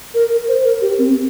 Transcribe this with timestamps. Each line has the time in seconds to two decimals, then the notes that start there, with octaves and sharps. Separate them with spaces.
0.14 A#4
0.48 C5
0.65 A#4
0.82 G4
0.99 C4